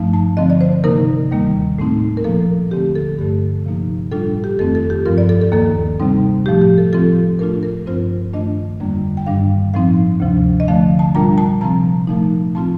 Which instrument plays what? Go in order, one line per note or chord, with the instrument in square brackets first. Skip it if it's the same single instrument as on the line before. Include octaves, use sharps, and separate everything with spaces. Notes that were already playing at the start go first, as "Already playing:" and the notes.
Already playing: [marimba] G2 F3 A3 D#4
A5
D3 F3 C4 D#5
D5
C5
C3 D#3 A#3 D#4 A#4
D#2 D#3 G3 A#3
A2 A3 C4 D#4
A#4
A#2 F3 A#3 A4
D#2 D3 A3 C4 G4
A4
G2 D3 A3 G4
C3 F3 A#3 D#4
A2 G3 D4 F4 A4
G4
F2 D#3 A3 C4 A4
A4
G4
G2 F3 C4 F4 A#4
D5
A4
A4
D#2 D#3 A#3 A4
C3 G3 C4 D#4
A2 F3 A3 G4
G4
A4
A2 F3 C4 F4 A4
A2 A3 D4 F4 A#4
A#4
G2 F3 C4 F4 C5
G2 D#3 A3 D4 F4 D#5
F2 D3 G3 A#3 D4
G5
G2 D#3 G3 D4 F5
A2 F3 C4 D#4 F5
D2 C3 F3
D#5
D3 F3 A3 F5
A5
A#2 G3 D4 F4 A#5
A5
C3 F3 C4 A#5
A#2 F3 A3 D#4
A2 F3 C4 F4 A5